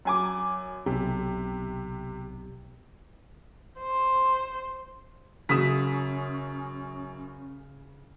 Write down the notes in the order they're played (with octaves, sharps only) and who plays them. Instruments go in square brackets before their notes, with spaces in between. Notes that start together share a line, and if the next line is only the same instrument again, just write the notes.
[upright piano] F#2 G#5 D6
[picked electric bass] B1 [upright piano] C3
[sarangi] C5
[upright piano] F#2 [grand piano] C#3 E7 [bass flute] C#4 [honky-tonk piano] D#6 B6